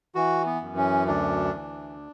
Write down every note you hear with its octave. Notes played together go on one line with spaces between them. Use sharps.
E3 F#4
B3
F#2
C#4
D2 D4
E3